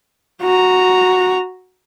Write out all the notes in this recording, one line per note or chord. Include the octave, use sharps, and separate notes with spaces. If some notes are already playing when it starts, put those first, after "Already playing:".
F#4 A#5